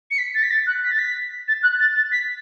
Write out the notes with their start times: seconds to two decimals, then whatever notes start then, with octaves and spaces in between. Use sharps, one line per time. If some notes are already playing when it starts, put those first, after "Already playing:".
0.11 C#7
0.18 B6
0.35 A6
0.43 B6
0.51 A6
0.67 F#6
0.84 B6
0.91 A6
0.99 B6
1.48 A6
1.63 F#6
1.80 A6
1.96 A6
2.12 B6